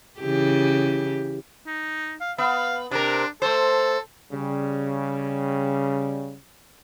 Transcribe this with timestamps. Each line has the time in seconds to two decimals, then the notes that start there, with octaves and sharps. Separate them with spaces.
0.20 C#3 E3 G4
1.66 D#4
2.21 F5
2.38 B3 F5
2.91 C3 D4 A#4
3.42 A3 A4 C5
4.32 C#3 G3